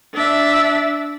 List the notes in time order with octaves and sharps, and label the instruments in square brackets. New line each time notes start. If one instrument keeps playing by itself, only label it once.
[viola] D4 E5